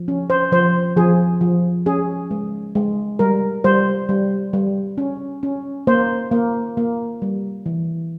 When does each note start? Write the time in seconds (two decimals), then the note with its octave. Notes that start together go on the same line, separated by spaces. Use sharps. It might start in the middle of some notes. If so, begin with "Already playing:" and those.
Already playing: F3
0.08 C#4
0.30 C5
0.52 F3 C5
0.97 F3 G#4
1.41 F3
1.86 C#4 G#4
2.31 G#3
2.75 G#3
3.19 G3 A#4
3.64 G3 C5
4.09 G3
4.53 G3
4.98 C#4
5.43 C#4
5.87 A#3 C5
6.32 A#3
6.77 A#3
7.22 G3
7.66 E3